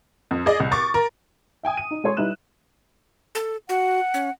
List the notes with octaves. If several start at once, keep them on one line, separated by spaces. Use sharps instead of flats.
F2
G#4 D5 D#5
C2
C#6 D6 A6
A#4
E5 G5 G#5 D#6
D#7
D#4
G#3 A4 C#5 C6
G3 D#4 E4 B4 F#6 E7
A4
F#4 F#5
C#4